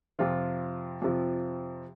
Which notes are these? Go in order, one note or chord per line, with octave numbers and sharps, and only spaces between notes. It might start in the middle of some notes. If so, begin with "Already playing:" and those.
F2 C3 F3 F4
F2 C3 F3